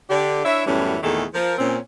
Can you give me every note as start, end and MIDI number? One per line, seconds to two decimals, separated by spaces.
0.10 0.44 50
0.10 0.44 67
0.10 0.44 74
0.45 0.65 62
0.45 0.65 64
0.45 0.65 73
0.45 0.65 76
0.66 0.97 42
0.66 0.97 45
0.66 0.97 52
0.66 0.97 55
0.66 0.97 59
0.66 0.97 61
1.03 1.25 40
1.03 1.25 46
1.03 1.25 51
1.03 1.25 57
1.03 1.25 68
1.03 1.25 69
1.34 1.55 53
1.34 1.55 70
1.58 1.78 46
1.58 1.78 60
1.58 1.78 61